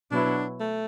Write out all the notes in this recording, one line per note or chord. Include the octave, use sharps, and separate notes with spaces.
B2 F#3 B3 D4 E4
A3